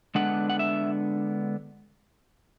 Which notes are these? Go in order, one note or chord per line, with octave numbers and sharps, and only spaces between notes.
D3 G#3 B3 D4 F#5
F#5
E5